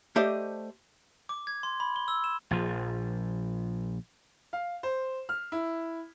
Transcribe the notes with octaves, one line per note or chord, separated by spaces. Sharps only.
A3 G4 C5 D5 D#5
D6
G#6
C6
B5
G7
E6
E7
A#1 F3
F5
C5
F6
E4